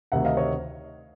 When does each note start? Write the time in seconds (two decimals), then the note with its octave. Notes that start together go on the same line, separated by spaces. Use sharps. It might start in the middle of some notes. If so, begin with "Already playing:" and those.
0.12 D2 C3 D#3 E5 F#5
0.25 D#5 F5
0.37 C#5 D#5